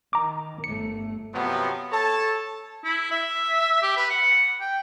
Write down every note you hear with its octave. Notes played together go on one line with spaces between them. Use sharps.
D#3 A#5 D6
G1 A3 C#7
C3 F3 F#3 B3
A4 C#5 A5
E4
E5
G4
B4
F#5
G5